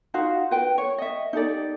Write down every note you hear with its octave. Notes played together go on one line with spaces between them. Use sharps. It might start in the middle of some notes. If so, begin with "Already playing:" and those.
D#4 F4 F#4 F5
B4 G5
C#5
D#5 E5
D#4 G4 A4 D5